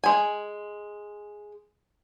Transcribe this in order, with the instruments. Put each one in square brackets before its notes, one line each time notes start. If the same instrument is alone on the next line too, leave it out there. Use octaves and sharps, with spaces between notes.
[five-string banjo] G#3 G#5